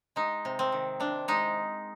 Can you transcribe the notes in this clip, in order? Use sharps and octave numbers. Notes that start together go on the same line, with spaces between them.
G#3 D#4
C3
C4
D#3
C3 D4
G#3 D#4